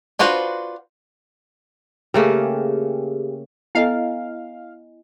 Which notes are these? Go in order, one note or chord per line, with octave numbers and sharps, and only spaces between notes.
D4 F4 F#4 B4 C5
C#3 A3 A#3 G4 G#4
B3 E4 A4 D#5 F5 G#5